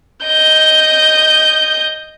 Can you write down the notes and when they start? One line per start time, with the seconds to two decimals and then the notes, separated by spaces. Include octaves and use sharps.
0.24 D#5 G6